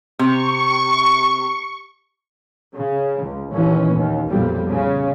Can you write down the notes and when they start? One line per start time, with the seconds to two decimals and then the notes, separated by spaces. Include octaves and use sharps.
0.19 C3 C#6
2.74 C#3
3.23 C#2
3.53 D#2 A#2 E3 C#4
3.92 D#2
4.27 B1 F2 A#2 G3
4.70 C#3